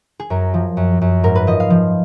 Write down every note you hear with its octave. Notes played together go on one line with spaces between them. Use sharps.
G#4
F#2 A#4
F3
F#2
F#2
G#2 A#4
B4
F3 D#5
F5
F3